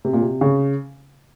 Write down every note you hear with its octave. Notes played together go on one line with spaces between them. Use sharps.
C3
A#2
C3
C#3